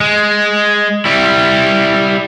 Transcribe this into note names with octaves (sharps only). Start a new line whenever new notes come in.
G#3
G3 E4